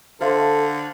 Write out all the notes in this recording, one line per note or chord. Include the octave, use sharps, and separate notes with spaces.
D3 A4 C5 E5 F5 C6